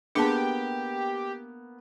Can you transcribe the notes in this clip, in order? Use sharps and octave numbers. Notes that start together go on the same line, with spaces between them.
A#3 B3 D4 G4 G#4 A5